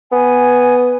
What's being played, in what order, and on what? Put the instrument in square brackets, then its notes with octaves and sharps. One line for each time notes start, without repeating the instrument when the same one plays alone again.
[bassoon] B3 [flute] G#5